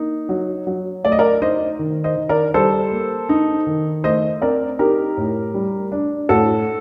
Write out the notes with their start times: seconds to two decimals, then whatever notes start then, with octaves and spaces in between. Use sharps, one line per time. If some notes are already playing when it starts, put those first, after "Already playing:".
Already playing: A#3 D#4
0.29 F#3
0.67 F#3
1.04 A3 D5
1.12 D#5
1.19 A#4 D5
1.42 D#4 C5 D#5
1.79 D#3
2.04 C5 D#5
2.16 D#3
2.29 A#4 D5
2.54 G3 A4 C5
2.91 A#3
3.29 D#4
3.67 D#3
4.04 A3 C5 D#5
4.42 C4 A#4 D5
4.79 D#4 G4 A#4
5.17 A2
5.54 G3
5.92 D4
6.29 A2 F#4 A4